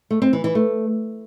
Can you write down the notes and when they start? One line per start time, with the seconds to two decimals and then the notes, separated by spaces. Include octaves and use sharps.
0.10 A3
0.22 C4
0.33 E3
0.44 E3
0.55 A3